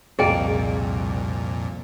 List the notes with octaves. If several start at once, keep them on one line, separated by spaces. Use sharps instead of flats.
C2 F2 A#2 A#3 G#4 D5 D#5 G5